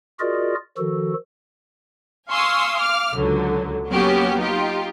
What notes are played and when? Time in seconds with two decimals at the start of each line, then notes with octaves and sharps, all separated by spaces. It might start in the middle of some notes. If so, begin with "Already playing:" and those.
0.20 F4 F#4 G#4 A#4 D5 D#5
0.77 D#3 F3 F#4 A4
2.30 F5 G#5 C6 C#6 D#6 E6
2.79 F5 D6 F6
3.15 C#2 D3 F#3
3.90 F#3 A#3 B3 C#4 F#4 G4
4.39 D#4 F4 G4